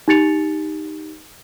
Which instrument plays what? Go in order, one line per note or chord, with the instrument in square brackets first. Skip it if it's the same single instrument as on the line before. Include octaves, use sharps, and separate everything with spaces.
[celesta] D#4 G4 A6 C#7 F7